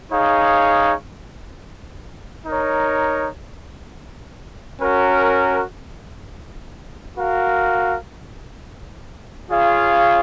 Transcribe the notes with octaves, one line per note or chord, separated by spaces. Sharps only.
D#4 G#4 C#5 F5
D#4 A#4 C#5
C#4 F#4 A#4
F#4 A#4 F5
F4 G#4 C#5 F5